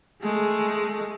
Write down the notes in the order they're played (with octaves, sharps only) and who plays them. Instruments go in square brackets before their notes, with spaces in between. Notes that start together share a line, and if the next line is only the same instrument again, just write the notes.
[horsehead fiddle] G#3 A3